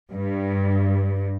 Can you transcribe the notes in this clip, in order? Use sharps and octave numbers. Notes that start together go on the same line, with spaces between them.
G2